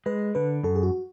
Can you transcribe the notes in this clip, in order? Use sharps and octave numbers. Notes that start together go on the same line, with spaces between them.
G#3 B4
D3 B4
F#2 A4
G#4
F#4